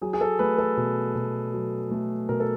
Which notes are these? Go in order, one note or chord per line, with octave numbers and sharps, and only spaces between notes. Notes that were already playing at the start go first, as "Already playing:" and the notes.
F#3 G#4
G#4
A4
A3 B4
A4
B2
B2
F#3
A3
B2 A#4
A4